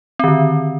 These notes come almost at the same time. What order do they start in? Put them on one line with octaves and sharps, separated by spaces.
C4 D#3 D3